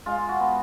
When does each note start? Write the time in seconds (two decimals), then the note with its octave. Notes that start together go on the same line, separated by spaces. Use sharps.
0.06 G#3 F4
0.29 F#4
0.40 B3